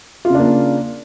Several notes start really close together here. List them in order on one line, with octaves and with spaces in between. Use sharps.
F4 C#3 D4 A#3